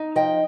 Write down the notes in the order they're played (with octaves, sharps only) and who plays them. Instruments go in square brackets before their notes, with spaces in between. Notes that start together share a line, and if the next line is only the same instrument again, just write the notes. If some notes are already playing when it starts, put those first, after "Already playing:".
Already playing: [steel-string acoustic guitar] D#4
F3 D#5 G5